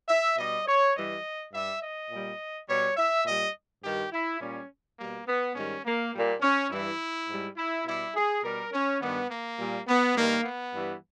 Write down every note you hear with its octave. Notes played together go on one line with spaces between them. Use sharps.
E5
B2 G3 D#5
C#5
G2 E3 G3 D#5
G2 G3 E5
D#5
A#2 G3
B2 G3 C#5
E5
A#2 G3 D#5
G2 D#3 G3 G4
E4
A#2 G3 C#4
B2 G3 A#3
B3
G#2 D#3 G3 C#4
A#3
A#2 G3
C#4
G2 E3 G3 E4
G#2 G3
E4
B2 G3 E4
G#4
B2 G3 A#4
C#4
G2 D#3 G3 B3
A#3
A#2 G3
B3
G2 D#3 G3 A#3
B3
G2 E3 G3